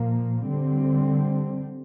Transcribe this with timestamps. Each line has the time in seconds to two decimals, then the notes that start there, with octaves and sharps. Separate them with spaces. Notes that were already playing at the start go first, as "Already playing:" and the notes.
Already playing: A#2 F3 A#3
0.47 D3 G3 C4